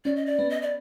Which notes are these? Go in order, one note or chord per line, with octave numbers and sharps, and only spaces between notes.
C#4 D5
D#5
D5
B3
D#5
D5